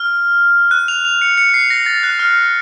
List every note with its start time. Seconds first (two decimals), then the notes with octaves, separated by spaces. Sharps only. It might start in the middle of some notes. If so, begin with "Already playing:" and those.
Already playing: F6
0.71 F#6
0.88 F7
1.05 F7
1.22 C#7
1.37 C#7
1.54 C7
1.70 A#6
1.86 A6
2.03 F#6
2.19 F6